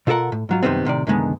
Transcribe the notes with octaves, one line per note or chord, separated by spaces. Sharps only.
B2 F4 A4 A#4 F#5
A2
G#2 F#3 F4
F#2 C3 D#3 G3 B3 C4
A2 C3 D#3 D5
C2 F#2 D3 D#3 G#3 B3